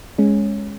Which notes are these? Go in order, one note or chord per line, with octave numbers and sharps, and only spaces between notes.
G#3 C#4